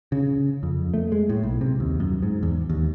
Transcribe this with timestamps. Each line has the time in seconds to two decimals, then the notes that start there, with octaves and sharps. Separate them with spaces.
0.12 C#3
0.63 F2
0.94 A3
1.12 G#3
1.30 A2
1.43 B1
1.61 C3
1.80 D#2
2.00 F#2
2.23 G#2
2.43 E2
2.70 D#2